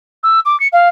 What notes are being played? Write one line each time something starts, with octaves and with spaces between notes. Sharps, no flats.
E6
D6
C#7
F5